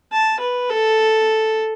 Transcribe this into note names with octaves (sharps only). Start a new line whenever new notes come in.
A5
B4
A4